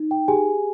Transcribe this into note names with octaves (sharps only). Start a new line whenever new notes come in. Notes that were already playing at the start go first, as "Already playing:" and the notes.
Already playing: D#4
G5
G4 G#4 G#5